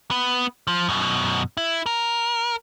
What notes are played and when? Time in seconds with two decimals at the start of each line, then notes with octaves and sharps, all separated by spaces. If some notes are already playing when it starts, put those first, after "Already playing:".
0.11 B3
0.67 F3
0.89 F#2 B2
1.57 E4
1.86 A#4